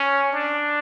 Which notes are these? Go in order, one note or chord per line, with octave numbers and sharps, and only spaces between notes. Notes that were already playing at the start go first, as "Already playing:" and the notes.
Already playing: C#4
D4